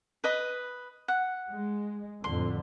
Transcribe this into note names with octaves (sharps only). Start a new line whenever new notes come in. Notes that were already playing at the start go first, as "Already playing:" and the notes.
B4 D#5 B5
F#5
G#3
F2 A2 D3 C6